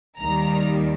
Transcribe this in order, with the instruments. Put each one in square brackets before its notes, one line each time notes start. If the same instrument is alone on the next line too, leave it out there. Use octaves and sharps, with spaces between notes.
[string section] D#2 D#3 G3 A#5